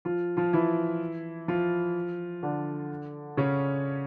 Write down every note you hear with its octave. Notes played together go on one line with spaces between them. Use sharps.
F3 F4
F3 F4
E3 E4
F3 F4
D3 D4
C#3 C#4